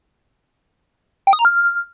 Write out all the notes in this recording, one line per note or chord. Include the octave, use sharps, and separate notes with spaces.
G5
D#6
A#5
F6